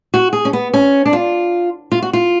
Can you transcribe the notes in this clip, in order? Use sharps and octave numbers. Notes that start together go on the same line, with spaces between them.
F#4
G#4
C#4
B3
C#4
D4
F4
F4
F#4
F4